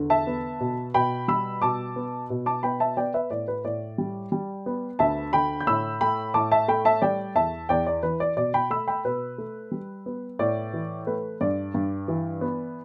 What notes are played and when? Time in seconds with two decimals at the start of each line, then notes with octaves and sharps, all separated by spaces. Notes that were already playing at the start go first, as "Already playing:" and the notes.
Already playing: E2 D3
0.10 E5 A5
0.27 B3
0.60 B2
0.94 B2 G5 B5
1.28 G3 B5 E6
1.62 B2 A5 D6
1.96 B3
2.30 B2
2.46 A5 D6
2.63 B3 G5 B5
2.80 E5 A5
2.97 B3 D5 G5
3.14 B4 E5
3.31 A2 D5
3.48 B4
3.65 A2 D5
3.98 G3
4.32 G3
4.66 B3
4.99 D2 E5 A5
5.33 D3 G5 B5
5.61 G6
5.67 A2 B5 E6
6.01 A3 G5 B5
6.34 A2 A5 D6
6.51 E5 A5
6.68 A3 G5 B5
6.85 E5 A5
7.02 G3 D5 G5
7.35 E2 E5 A5
7.69 E2 D5 G5
7.87 D5
8.03 E3 B4
8.20 D5
8.37 B2 D5
8.54 G5 B5
8.70 A3 B5 E6
8.88 G5 B5
9.05 B2 B4
9.38 A3
9.72 G3
10.06 B3
10.39 A2 D5
10.73 E3
11.07 A3 B4
11.41 G2 D5
11.74 G2
12.08 E3
12.41 B3